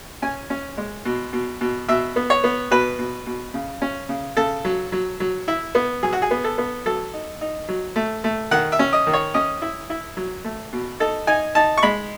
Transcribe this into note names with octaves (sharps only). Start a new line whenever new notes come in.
C#4 G#5
C#4
G#3
B2
B2
B2
B2 E5
B3
C#5
B3
B2 B4
B2
B2
C#3
C#4
C#3
C#3 A4
F#3
F#3
F#3
E4
B3
F#3 G#4
F#4
G#4
B3
A4
B3
F#3 A4
D#4
D#4
F#3
A3
A3
D#3 F#5
E5
C#4
D#5
D#3
C#5
C#4 D#5
E4
E4
F#3
A3
B2
D#4 A4
D#4 G#5
D#4 A5
C#6
G#3 B5